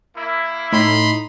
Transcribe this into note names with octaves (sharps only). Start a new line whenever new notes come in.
A#3 E4
A2 D#4 B5 C6